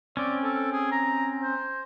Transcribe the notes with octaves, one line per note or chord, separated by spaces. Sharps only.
C4 C#4 D5
A4
G#4
A#5
C5